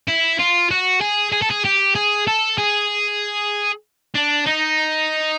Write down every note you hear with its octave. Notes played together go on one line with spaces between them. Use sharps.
E4
F4
F#4
G#4
G#4
A4
G#4
G4
G#4
A4
G#4
D4
D#4